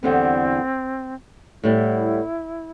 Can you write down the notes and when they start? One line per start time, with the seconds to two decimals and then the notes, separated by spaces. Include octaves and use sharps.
0.02 E2 D3 G3 B3 C4
1.63 A2 G3 B3 E4